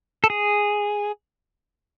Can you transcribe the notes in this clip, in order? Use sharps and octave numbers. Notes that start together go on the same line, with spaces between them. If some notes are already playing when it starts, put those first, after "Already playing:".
A4
G#4